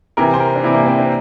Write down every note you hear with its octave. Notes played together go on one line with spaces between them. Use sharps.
C3 E3 A#4
C5
A#4
D4
C3 E3 E4
A#3
C4
D4